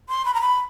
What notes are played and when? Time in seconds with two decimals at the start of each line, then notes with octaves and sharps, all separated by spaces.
0.09 C6
0.25 B5
0.34 A#5
0.41 B5